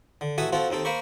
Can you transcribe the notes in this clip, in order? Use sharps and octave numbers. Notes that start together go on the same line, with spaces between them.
D3
A1 F#4 A4 E5 G#5 D#6
F3 C4 F4 F#4 A4
D#2 D#3 C4 A4
A#3 A#4 C5 B5 C#6